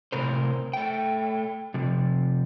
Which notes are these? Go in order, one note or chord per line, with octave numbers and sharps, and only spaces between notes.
A2 C3 A#4 C5
A3 G5
C3 F3